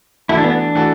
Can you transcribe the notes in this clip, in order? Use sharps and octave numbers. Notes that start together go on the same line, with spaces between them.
E3 A3 E4 F#4 A4
D4
B3
D4
E3 A3 F#4 A4